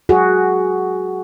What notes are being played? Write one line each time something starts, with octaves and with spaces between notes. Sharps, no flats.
F#4 G#4